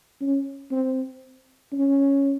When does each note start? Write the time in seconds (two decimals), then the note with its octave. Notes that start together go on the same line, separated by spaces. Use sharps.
0.21 C#4
0.71 C4
1.73 C#4